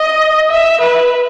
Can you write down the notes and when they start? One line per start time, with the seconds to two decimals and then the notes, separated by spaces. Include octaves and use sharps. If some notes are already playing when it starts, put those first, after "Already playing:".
Already playing: D#5
0.50 E5
0.80 B4